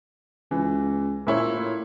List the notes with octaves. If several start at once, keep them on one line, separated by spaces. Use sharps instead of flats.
C#2 E3
A#2 E4 C#5
A2